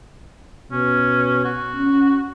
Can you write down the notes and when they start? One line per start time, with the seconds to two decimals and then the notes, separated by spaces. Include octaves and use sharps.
0.72 B2 C#4
1.45 F#4
1.75 C#4